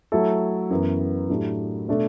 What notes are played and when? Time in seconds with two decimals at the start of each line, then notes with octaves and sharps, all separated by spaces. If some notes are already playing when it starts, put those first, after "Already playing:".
0.12 F#3 A3 E4 A4
0.70 F#2 E3 B3
1.29 A2 F#3 A3 D4 G4
1.87 B2 A3 D4 A4